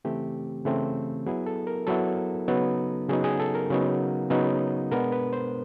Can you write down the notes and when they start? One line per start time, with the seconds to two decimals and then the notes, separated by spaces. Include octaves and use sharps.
0.05 C#3 E3 A3 C4 G4
0.65 C#3 E3 A3 C4
1.26 F#3 B3 E4 G#4
1.46 A4
1.67 A#4
1.87 F#3 B3 E4 A4
2.48 C#3 F#3 B3 D#4
3.09 C#3 F#3 B3 D#4 G#4
3.24 G#4
3.40 A4
3.55 A#4
3.70 C#3 F#3 B3 D#4
4.30 C#3 F#3 B3 D#4
4.91 B2 G#3 B3 D4 A#4
5.12 B4
5.33 C5